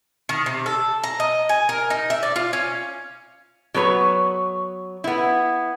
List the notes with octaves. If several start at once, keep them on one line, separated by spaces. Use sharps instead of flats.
D#3
C3
A4
A#5
D#5
G#5
A#4
D#4
E5
D5
F4
C#4
F#3 B3 B4 C#5
B3 E4